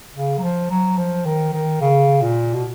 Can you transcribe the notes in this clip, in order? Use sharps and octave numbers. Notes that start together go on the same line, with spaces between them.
C#3
F#3
F3
F#3
F3
D#3
D#3
C#3
A#2
B2